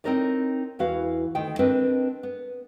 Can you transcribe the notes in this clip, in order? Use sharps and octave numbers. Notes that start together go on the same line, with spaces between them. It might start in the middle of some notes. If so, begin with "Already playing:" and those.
C4 D4 D#4 A#4 C#5 D5
E2 E3 F#4 F5
D2 D#3 G5
C4 D4 A#4 B4 D#5
B3